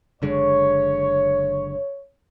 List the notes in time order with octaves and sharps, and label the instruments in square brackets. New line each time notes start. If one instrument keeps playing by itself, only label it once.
[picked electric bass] F#1 D3 G#3 [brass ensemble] C#5